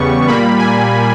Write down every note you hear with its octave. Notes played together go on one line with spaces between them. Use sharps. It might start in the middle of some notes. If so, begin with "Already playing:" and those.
Already playing: E2 C#3 G3 B3 C#6
A#2 G3 A#3 B5
G#5